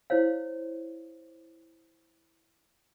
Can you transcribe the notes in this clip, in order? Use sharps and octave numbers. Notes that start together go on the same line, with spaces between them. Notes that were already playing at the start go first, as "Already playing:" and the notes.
E4 C5 C#5 F5